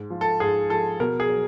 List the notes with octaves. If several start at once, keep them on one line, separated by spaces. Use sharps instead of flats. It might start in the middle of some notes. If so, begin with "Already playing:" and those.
Already playing: G#2
F3
A4
G#2 G#4
F3 A4
B2 A#4
G#4
F#3